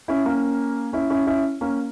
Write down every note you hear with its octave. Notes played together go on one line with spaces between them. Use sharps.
C#4 E4
A#3 C#4
C#4 E4
C#4 E4
C#4 E4
A#3 C#4